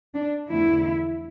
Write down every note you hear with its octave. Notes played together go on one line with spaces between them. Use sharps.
D4
E2 D3 F3 A3 E4